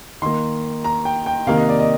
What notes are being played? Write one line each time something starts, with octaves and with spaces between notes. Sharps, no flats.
D#3 A#3 C6
A#5
G5
G5
C3 D#3 A#3 F5
D#5
D5
D#5